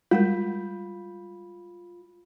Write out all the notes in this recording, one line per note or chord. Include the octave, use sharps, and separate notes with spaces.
G3 G#3 F4 A#4